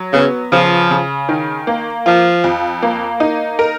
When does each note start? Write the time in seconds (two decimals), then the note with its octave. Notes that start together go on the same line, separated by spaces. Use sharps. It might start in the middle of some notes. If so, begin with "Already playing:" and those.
Already playing: F#3
0.14 C#3 B3
0.52 C#3 F3
0.91 C#3
1.29 D#3
1.67 A#3
2.05 F3 F4
2.44 F2
2.82 A#3
3.20 D#4
3.59 A#4